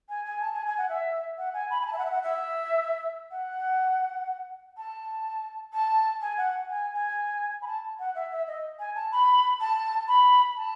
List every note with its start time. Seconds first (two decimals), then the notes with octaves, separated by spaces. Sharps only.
0.09 G#5
0.26 G#5
0.41 A5
0.53 G#5
0.66 G#5
0.78 F#5
0.89 E5
1.38 F#5
1.54 G#5
1.70 B5
1.81 G#5
1.87 A5
1.93 E5
1.98 F#5
2.05 E5
2.11 F#5
2.23 E5
3.31 F#5
4.77 A5
5.73 A5
6.22 G#5
6.37 F#5
6.70 G#5
6.94 G#5
7.62 B5
7.67 A5
7.99 F#5
8.15 E5
8.31 E5
8.47 D#5
8.79 G#5
8.95 A5
9.12 B5
9.60 A5
10.08 B5
10.57 A5